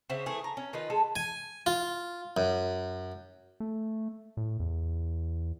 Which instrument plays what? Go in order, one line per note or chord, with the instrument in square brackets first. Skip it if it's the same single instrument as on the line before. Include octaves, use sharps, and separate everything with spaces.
[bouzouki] C#3 C5 E5 F#5
E3 A3 G#4
A#5
C#4
D#3 D#4 F4 B4
G#3 A4
[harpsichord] G#5
F4
F#2
[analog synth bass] A3
A2
E2